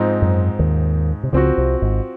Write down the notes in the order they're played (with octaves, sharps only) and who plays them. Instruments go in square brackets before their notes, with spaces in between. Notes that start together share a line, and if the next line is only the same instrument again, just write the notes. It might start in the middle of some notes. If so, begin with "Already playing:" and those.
Already playing: [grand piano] G#2 F3 C4 D#4
[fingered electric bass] F#2 F#3
D#2 D#3
C3
[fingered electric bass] C#2 C#3 [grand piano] F3 C4 F#4
[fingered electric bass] C2 C3
G#1 G#2